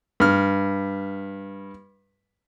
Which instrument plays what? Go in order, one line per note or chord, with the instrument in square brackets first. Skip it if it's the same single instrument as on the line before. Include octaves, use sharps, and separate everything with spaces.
[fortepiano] G2 F6